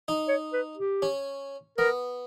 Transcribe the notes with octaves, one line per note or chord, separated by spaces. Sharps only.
D#4
C#5
B4
G4
C#4
B3 A#4